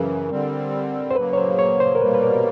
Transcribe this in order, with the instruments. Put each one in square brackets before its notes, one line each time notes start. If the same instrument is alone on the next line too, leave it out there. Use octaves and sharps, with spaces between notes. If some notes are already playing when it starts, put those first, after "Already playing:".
Already playing: [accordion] F#2 C#3 E3 [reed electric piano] A#4
[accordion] D3 G3 C4
[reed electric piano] C5
[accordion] C#3 F#3 A#3 [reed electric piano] B4
[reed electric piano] C#5
C5
C#5
C5
A#4
[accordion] B2 G3 A#3 [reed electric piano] B4
[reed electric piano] B4
A#4